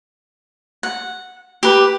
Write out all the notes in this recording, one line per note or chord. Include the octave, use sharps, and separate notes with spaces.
F#5
G4 B4